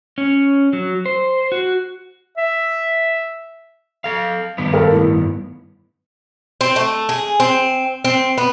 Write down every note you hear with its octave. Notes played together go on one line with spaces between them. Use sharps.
C#4
F#3
C5
F#4
E5
A4 F5
G2 D#3 B3
A4 A#4 F5
A2
C4
A3
G#4
C4
C4
B3